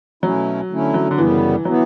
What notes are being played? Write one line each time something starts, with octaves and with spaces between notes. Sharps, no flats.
B2 F#3 A3 C#4 E4
D3 A3 C#4 E4
F#3
D3
F#2 C#3 E3 G3 B3
E3 F#3 B3